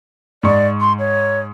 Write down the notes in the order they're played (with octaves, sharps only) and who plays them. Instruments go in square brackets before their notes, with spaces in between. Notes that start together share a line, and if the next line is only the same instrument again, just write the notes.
[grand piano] G#2 C#6 [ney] D5
[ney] C6
C#5